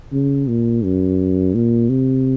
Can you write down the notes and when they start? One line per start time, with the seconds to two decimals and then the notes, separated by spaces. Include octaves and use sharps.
0.13 C#3
0.48 A#2
0.84 F#2
1.55 A#2
1.89 C3